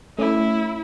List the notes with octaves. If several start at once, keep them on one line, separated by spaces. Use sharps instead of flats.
A3 C#4 E4